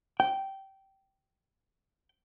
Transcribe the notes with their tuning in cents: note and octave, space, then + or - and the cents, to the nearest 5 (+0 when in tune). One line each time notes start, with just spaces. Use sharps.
G5 -15